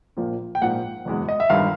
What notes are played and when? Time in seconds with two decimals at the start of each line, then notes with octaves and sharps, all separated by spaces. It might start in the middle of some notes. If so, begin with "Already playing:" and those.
0.17 A#1 A#2 F3 A#3
0.55 G5
0.61 A#1 G#2 F3 A#3 F#5
1.05 F#1 E2 B2 G#3
1.29 D#5
1.40 E5
1.50 G1 G2 D#3 F5